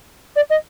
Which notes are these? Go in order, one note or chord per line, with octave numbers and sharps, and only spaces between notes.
D5
D#5